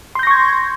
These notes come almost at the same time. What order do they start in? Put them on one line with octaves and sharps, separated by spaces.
C6 G6 A#6 C#6 G#6